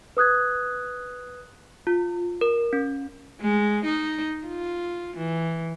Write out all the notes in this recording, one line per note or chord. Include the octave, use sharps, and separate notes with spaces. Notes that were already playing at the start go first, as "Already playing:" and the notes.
B4 D#6 F#6 G#6
F4
A#4
C#4
G#3
D#4
F4
E3